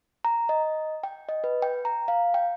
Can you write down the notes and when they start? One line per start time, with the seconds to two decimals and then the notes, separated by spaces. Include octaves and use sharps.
0.25 A#5
0.49 D#5
1.03 G5
1.29 D#5
1.44 B4
1.62 G5
1.85 A#5
2.08 F5
2.34 G5